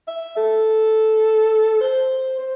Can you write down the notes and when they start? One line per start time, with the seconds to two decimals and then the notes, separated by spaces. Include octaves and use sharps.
0.08 E5
0.37 A4
1.81 C5
2.39 C5